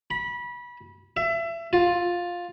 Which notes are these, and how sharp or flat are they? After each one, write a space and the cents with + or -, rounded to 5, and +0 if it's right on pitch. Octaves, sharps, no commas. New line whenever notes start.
B5 -25
E5 +25
F4 +10